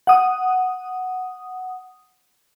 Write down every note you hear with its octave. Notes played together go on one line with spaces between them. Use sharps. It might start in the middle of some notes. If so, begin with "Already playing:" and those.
F#5 D#6